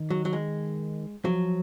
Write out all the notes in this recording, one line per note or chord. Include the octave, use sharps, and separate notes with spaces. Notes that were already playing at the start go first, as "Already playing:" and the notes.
Already playing: D#3
F#3
F#3
G#3
F3 F#3